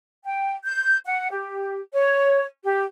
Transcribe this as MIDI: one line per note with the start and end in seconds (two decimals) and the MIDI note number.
0.24 0.55 79
0.66 0.97 91
1.06 1.27 78
1.31 1.79 67
1.93 2.43 73
2.64 2.83 67